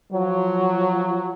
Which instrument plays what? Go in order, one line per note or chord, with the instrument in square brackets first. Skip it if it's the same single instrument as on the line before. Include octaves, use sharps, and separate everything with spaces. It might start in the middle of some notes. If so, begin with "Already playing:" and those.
[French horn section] F3 F#3